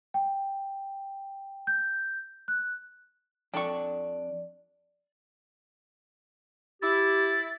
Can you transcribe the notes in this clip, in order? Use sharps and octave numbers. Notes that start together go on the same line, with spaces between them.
G5
G6
F#6
F2 D4 A4 D5 G5 C#6
E4 G4 A6